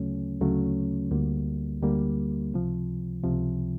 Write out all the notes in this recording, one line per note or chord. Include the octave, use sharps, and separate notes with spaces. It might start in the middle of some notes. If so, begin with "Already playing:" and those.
Already playing: D2 C#3 F#3 A3 C#4
D2 C#3 F#3 A3 C#4
D2 D3 G3 A#3
D2 D3 G3 A#3
C#2 C3 F3
C#2 C3 F3